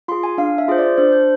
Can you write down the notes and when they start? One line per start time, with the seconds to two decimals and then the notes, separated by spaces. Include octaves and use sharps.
0.08 F4 G#4 C6
0.23 G#5
0.38 D4 F5
0.58 E5
0.68 F4 G#4 C5
0.78 D5
0.97 D4 C5
1.12 C5